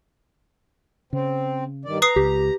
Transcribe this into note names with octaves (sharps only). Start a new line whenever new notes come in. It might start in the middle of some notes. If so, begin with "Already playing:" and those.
C#3 C4
G2 D#3 D5
B4 A#5 D#6 C7
C#2 G4